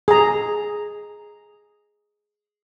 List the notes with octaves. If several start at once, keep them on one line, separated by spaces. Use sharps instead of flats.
G#4 A#5